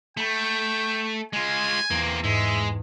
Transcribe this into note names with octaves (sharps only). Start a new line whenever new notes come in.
A3 G5 B5 G6
G#3 F4 G#5
E2 A#3 C4
G#2 G#3 E5